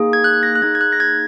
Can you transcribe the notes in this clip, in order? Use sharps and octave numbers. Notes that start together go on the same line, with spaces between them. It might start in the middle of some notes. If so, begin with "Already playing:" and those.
Already playing: A#3 D#4 G#4
G#6
F#6
A#6
F#6
A#3 D#4 G#4 G#6
G#6
F#6
A#6
G#6